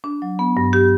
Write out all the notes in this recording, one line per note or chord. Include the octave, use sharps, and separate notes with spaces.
D4
F#3
B3
G2
G4